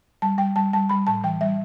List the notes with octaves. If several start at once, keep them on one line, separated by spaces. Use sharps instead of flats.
G3 A5
G3 G5
G3 A5
G3 A5
G3 B5
A2 A5
E3 G5
G3 E5